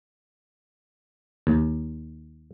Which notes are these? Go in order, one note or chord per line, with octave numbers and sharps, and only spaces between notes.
D#2